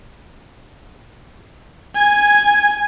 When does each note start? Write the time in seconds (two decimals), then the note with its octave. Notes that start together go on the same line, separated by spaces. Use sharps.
1.95 G#5 G#6